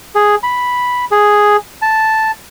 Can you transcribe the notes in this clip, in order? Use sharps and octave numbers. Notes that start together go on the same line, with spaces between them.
G#4
B5
G#4
A5